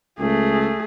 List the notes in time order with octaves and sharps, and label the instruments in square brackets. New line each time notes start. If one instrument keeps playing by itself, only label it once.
[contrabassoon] C#2 [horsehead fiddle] A3 G#4